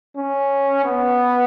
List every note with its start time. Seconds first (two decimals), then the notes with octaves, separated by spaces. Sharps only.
0.16 C#4
0.85 B3